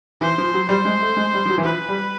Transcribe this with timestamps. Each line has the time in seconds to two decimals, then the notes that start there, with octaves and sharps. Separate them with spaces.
0.21 E3 C5
0.38 F3
0.54 F#3
0.69 G3 C5
0.85 G#3
1.01 A3
1.17 G#3
1.34 G3
1.45 F3
1.50 F#3
1.58 E3
1.64 F3 B4
1.89 G3